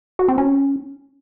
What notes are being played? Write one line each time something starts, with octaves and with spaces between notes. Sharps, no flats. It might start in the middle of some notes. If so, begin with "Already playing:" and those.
F#4
C4
C#4